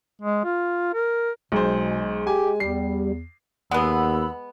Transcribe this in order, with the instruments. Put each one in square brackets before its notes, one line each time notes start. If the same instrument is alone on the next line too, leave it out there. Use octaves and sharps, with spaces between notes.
[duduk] G#3
F4
A#4
[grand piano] B1 C5 [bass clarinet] B2 [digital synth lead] G#3
[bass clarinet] G4 [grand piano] G#5
[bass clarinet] E2 [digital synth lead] G3 [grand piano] C7
[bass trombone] D#2 [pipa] G#3 B3 [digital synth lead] F#5 [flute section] B5 E6